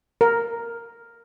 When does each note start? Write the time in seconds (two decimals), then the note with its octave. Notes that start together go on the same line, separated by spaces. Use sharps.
0.21 A#4